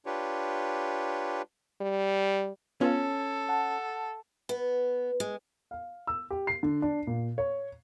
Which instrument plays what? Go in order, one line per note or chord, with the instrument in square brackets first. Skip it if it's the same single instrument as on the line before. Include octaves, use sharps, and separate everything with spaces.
[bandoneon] D4 F4 G4 B4 C#5
[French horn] G3
[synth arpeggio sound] B3 F4 [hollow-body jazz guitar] C#4 [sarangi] A4
[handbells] F#5 A5
[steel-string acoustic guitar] B3
G#3
[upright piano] F5
E6
G4
C7
D3
D4
A#2
C#5